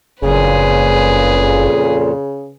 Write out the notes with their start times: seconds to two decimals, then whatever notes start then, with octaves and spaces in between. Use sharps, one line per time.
0.22 F#1 F2 A#2 C#3 G#4 B4